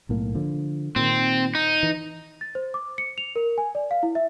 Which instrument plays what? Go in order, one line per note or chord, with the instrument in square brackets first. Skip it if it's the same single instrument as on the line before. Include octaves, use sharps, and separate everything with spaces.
[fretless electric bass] B1 A2 A#3
D3 F3
[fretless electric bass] A#2 D#3 [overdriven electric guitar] C4
[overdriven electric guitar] D#4
[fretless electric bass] E3
[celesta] A6
C5
D6
C#7
F7
A#4
G#5
D5
F5
E4
E5